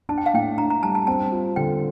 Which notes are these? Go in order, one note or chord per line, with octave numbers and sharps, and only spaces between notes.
D4 A5
G5
F5
A2 G5
D4 A#5
A#5
G3 A5
A5
C4 A5
F4
D3 G5